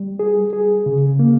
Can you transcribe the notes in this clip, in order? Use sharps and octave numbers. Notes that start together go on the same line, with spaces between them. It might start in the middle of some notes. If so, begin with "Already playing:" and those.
Already playing: G3
G#4
G#4
C#3
A#3